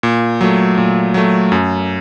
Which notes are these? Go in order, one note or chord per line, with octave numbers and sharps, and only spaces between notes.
A#2
F#3 A3
A#2
F#3 A3
F#2